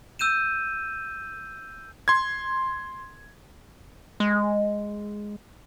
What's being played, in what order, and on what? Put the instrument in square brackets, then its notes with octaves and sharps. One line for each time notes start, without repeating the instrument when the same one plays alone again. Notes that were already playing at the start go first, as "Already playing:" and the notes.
[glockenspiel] E6 G6 D#7 E7
[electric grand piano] C6 G#6
[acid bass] G#3